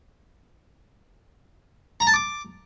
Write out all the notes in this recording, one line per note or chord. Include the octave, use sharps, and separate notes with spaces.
A#5
A5
D6